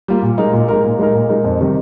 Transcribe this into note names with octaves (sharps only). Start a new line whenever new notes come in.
G3 A#3 F4
A#2
G#3 D#4 A#4
A#2
G#3 D#4 A#4
A#2
G#3 D#4 A#4
A#2
G#3 D#4 A#4
F2
C3 D#3 G3